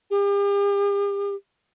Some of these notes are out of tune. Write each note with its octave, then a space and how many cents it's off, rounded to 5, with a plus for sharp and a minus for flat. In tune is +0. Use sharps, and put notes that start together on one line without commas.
G4 +45